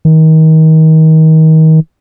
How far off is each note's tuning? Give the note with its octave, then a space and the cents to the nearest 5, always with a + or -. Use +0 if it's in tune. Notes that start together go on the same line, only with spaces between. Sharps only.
D#3 +30